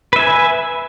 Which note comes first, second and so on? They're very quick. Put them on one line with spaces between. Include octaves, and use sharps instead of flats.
B4 E5 G#5